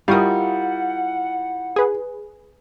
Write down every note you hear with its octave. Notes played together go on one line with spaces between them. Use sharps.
G3 E4 F4 A#4 F5 F#5 C#6 D#6
G#4 B4